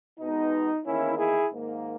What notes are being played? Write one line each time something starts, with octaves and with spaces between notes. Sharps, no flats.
B2 G#3 B3 D#4
E2 D#3 A#3 C#4 E4
E4 G#4
G#2 D#3 A#3